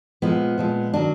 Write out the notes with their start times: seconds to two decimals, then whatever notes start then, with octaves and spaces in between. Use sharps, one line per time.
0.22 A#2 F3 G#3 B3
0.58 A#2 F3 G#3
0.94 D#3 F#3 D4